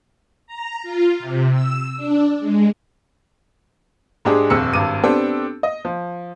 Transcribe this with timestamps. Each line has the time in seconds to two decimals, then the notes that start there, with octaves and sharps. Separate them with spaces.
0.47 A#5
0.83 F4
1.20 C3
1.52 E6
1.97 D4
2.39 G#3
4.25 G#2 G#3 D4 G4 G#4
4.50 D#1 F2 E6 C#7
4.73 G#1 G2 D6 D#7
5.04 B3 C4 D4 G4 A4
5.63 D#5
5.85 F3